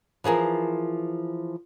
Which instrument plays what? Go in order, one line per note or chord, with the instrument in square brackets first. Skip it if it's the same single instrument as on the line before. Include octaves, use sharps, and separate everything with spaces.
[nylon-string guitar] E3 F3 G#4 A#4